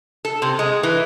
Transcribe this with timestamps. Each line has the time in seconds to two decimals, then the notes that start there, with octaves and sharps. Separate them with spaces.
0.25 A4
0.42 C3
0.59 G#3
0.83 E3